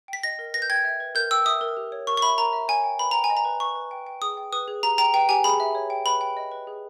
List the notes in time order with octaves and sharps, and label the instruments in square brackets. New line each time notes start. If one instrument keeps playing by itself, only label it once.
[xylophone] G5 B6
D#5 A#6
A#4
B4 A#6
G6
G5 G#6
E5
B4
A#4 G6
G5 E6
E5 D#6
A#4
G4
C#5
A#4 C#6
C#6
E5 B5
A#4 A#5
E5
C#5 G#5
G5
B4 B5
G5 A#5
G#5
D#5
A#5
B4
B4 C#6
B4
G5
G5
G#4 D#6
G5
B4 D#6
G#4
G4 A#5
G5 A#5
B4 G5
G4 G#5
G#4 B5
E5
C#5
G5
B4 B5
G5
D#5
B4
G#4